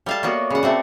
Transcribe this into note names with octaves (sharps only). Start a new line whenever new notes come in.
G3 A4 D5 E5 F5 A5
A#3 B3 F#4 C#5 D5 E5
C#3 B4 D5 F#5
A3 C4 F#4